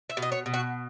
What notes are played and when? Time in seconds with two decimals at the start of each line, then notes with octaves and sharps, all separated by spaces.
0.10 E5
0.17 B2
0.22 D#5
0.32 C#5
0.46 B2
0.54 F#4